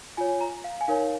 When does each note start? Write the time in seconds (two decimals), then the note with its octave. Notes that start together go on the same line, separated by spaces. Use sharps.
0.17 F4 C#5 G#5
0.41 A#5
0.64 F5
0.81 G#5
0.88 D#4 A#4 C#5 F5